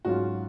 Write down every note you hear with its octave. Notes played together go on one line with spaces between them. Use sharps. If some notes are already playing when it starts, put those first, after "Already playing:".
G#2 F#3 C#4 F4 F#4